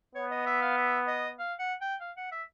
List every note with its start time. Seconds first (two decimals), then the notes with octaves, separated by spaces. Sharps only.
0.15 B3 C#5
0.31 D#5
0.46 E5
0.62 F5
0.77 E5
1.08 D#5
1.39 F5
1.59 F#5
1.81 G5
2.00 F5
2.17 F#5
2.32 E5